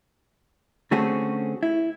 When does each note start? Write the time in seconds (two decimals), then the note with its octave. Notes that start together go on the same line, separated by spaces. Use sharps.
0.91 D3 A3 C4 C#4 F#4 G#4
1.63 E4